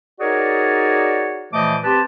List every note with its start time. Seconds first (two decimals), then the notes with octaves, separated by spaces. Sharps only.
0.20 D#4 F#4 G#4 A#4 C#5 D5
1.53 A#2 E3 F3 A3 D#5 D6
1.84 C4 G4 B4 A5